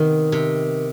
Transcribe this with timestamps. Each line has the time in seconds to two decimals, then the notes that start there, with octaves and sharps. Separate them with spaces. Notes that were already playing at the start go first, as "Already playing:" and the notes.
Already playing: C3 D#3 B3
0.32 C3